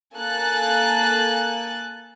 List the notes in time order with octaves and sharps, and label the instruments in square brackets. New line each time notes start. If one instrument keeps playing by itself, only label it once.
[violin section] A#3 A4 G#5 F#6 A6